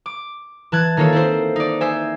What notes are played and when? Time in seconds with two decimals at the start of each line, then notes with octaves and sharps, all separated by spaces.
0.06 D6
0.72 E3 A5 F#6 G#6
0.97 D#3 A#3 F4 A4 C#5
1.13 C4 E4 C5
1.56 D#4 D5
1.81 C5 E5 G#5